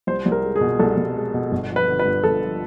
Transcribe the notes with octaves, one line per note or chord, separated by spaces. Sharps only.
C2 C5
C2
A#4
G#3
G#4
B2
C2 A4
C2
G#3
B2
G1
F3
B4
D3
B4
G2
G1 A4
F3